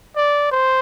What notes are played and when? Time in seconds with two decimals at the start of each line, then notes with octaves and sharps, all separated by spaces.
0.16 D5
0.52 C5